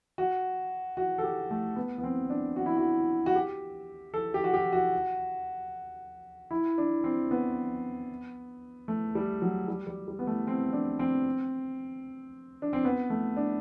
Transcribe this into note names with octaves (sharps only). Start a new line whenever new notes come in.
F#4
F#4
A4
G4
A3
B3
B3
C4
D4
F#4
E4
F#4
F#4
G4
A4
G4
F#4
G4
F#4
E4
D4
C4
B3
A3
G3
F#3
G3
G3
G3
B3
A3
C4
D4
C4
D4
C4
B3
A3
D4